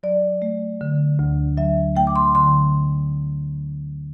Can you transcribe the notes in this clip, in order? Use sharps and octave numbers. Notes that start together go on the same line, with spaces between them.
F#3 D5
A3
D3
D2
F#3 E5
A3 G5
D6
C6
D3 C6